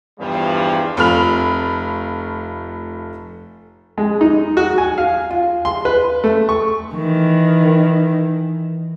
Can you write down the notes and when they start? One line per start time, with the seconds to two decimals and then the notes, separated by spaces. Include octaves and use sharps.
0.19 E2 G2 C#3 F3 G3
0.97 F1 A3 F4 B5 F6 F7
3.98 G#3
4.21 D#4
4.57 F#4
4.78 G#5
4.98 F5
5.30 F4
5.65 C6
5.85 B4
6.24 A3
6.49 C#6
6.94 D#3 E3